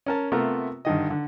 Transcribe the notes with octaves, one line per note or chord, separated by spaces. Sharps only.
C#4 A#4 A5
C3 A3 B3 F4 A#4
G2 D3 D#3 D#5
D3